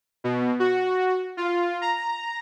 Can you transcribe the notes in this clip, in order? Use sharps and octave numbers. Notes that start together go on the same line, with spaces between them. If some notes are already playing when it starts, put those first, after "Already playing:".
B2
F#4
F4
A#5